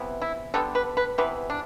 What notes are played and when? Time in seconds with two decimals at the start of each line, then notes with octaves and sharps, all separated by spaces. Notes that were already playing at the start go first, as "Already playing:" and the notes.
Already playing: C3 E3 B3
0.21 E4
0.54 D3 G3 B3 A4
0.75 B4
0.97 B4
1.18 C3 E3 B3 B4
1.50 D4